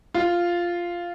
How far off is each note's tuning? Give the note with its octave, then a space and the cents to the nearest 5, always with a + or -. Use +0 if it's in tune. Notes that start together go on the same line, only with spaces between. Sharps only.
F4 -5